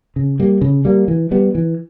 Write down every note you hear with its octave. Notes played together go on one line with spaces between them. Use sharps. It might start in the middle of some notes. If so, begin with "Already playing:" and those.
C#3
G3 A#3
C#3
G3 A#3
E3
G3 B3
E3